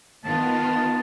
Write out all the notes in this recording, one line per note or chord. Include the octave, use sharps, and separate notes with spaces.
D#3 B3 F4 A5